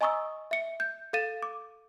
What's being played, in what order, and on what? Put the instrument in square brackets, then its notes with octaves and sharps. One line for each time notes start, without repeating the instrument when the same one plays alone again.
[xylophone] D#5 G#5 A#5 C#6 D#6 E6
E5 C#7
G6
A4 F5 A6 D#7 E7
D6